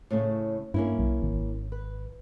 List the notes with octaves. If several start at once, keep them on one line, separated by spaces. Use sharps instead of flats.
A2 C#3 A3
G2 A#3 C#4 E4
B1
G#1
B4